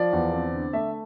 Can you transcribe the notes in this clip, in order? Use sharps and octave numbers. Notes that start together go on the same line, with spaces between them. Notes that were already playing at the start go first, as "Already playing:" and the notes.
Already playing: F3 D5
E2
C4
D3
A3 E5